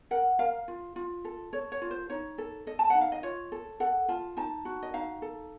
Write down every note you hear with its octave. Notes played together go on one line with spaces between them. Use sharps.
A#4 F#5
A#4 F5
F4
F4
A4
A4 C#5
C#5
F4
C5
D#4 C#5
A4
A4 D#5
A5
D#4 F#5
F5
D#5
F4 C#5
A4
A4 F#5
F4 A5
D#4 A5
F#4
D#5
D#4 F5
A4